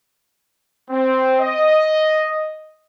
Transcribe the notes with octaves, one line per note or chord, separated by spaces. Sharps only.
C4
D#5